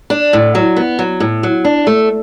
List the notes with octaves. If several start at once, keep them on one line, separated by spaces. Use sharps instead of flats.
D4
A2
F#3
B3
F#3
A2
F#3
D4
A3